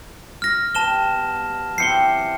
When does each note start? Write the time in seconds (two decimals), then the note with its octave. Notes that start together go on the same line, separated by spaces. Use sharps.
0.42 F6 A#6
0.75 B2 G3 A5 E7 G7
1.78 E3 C4 G4 C7 C#7 G7